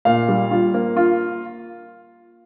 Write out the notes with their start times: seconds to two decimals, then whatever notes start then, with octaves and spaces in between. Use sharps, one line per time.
0.05 A#2 F5
0.28 G3
0.51 F4
0.74 A#3
0.97 F4